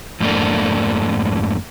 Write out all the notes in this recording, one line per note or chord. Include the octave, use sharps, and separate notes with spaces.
F2 G#2 A3 A#3 D4